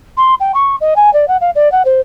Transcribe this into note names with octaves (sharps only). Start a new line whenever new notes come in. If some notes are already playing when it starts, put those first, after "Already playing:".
C6
G5
C#6
D#5
G#5
D5
F#5
F5
D5
F#5
C5